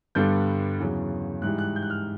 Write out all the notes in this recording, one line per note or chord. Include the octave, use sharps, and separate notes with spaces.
G2 D3 G3 B3 D4 G6
E2 C#3 F#3
G#2 E3 G3 F#6
F#6
G6
F#6
F6